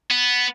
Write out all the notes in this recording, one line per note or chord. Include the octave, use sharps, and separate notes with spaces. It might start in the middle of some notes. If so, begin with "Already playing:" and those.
B3